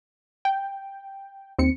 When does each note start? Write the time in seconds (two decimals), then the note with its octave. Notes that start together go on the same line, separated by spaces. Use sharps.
0.45 G5
1.58 D#2 C4 C#7